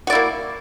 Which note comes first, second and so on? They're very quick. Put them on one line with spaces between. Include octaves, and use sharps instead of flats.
F#4 D5 E4 A#3